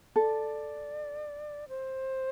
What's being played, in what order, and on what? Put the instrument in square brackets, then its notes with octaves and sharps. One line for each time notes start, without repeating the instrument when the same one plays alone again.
[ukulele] A4 [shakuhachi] D5
[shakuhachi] C5